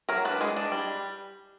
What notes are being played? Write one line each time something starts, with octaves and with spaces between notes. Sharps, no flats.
F#3 A#4
D4 B4
G#3
D4
G3